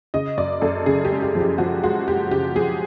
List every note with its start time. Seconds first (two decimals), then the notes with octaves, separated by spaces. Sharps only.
0.14 C#3 D#5
0.37 F#2 D5
0.61 F#2 A4
0.86 C#3 G#4
1.05 G4
1.11 G#3
1.22 G4
1.35 F3
1.40 G4
1.58 F3 F#4
1.83 G#3 F#4
2.08 G#3 G4
2.31 C#3 G4
2.56 F3 G#4